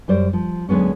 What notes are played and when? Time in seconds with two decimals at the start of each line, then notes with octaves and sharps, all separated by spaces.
0.08 F#2 G3 C5 D5
0.33 F3
0.69 D2 F#3 G#3 B3 C#4